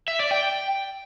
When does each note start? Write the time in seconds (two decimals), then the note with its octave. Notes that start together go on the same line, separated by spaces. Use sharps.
0.08 E5
0.19 D5
0.31 G5